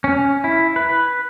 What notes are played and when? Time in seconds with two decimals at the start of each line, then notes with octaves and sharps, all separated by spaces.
0.04 C#4
0.44 E4
0.76 B4